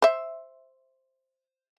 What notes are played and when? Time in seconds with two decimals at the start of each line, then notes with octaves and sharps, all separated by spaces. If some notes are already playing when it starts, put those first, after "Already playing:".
0.02 C5 E5